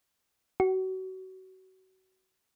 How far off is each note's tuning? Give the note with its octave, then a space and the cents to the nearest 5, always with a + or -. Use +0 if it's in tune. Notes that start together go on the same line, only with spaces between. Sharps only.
F#4 +30